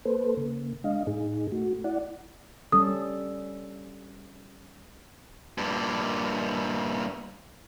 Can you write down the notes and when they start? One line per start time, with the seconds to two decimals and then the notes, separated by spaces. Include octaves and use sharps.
0.05 A#3 A4 B4 C5
0.37 C#3 A#3
0.84 G#3 D4 D#5 F5
1.07 A2 D#4 G#4
1.52 A3 F#4
1.84 E4 D5 F#5
2.72 G3 C#4 A4 D#6
5.58 G2 A#2